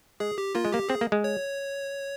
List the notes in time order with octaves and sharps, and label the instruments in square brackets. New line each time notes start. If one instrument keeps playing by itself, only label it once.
[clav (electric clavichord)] G#3 [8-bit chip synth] G#4
[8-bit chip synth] G4
[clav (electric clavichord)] A#3 [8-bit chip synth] F4
[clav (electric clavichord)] G#3
[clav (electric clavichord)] A#3 [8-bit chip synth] G4
[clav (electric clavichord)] C4 [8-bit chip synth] G#4
[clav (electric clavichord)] A#3
G#3
[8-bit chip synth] C#5